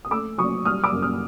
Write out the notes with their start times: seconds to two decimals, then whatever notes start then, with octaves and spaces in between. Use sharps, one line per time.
0.05 D#6
0.11 A3 D6 E6
0.38 F#3 C#6 D#6
0.65 G3 D#6 F6
0.83 D6 E6
0.93 F#2
1.02 D#6 F6